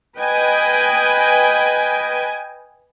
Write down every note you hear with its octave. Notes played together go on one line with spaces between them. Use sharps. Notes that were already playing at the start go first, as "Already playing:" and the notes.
B4 D#5 G5 G#5